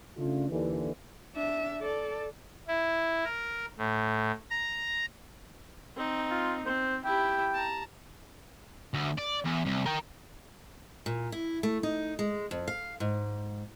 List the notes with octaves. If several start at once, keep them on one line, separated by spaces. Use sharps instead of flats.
C#3 A3 D4 F4
D#2 D3 E3
D4 E5
A4 D5
E4
A#4
A2
A#5
C4 D#4
F4
C4 C5
E4 G4 G5
A5 A#5
D2
D5
E2
C2
A#4 G5
A#2
E4
A3
D#4
G#3
F2
F5
G#2